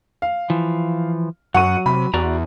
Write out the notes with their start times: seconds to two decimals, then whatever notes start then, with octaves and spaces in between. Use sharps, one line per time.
0.22 F5
0.50 E3 F3
1.54 F#2 F#3 F#5 C#6 D#7
1.86 C3 B5
2.14 E2 F#4 D5 A#5